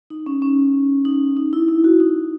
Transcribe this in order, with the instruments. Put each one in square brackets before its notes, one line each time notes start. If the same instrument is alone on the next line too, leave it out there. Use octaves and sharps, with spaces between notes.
[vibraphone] D#4
C#4
C#4
D#4
D#4
E4
E4
F#4
D#4